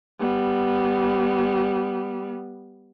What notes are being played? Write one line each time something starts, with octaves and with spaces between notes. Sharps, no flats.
G3 B3